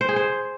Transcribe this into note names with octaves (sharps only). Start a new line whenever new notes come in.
C5
G#4
C5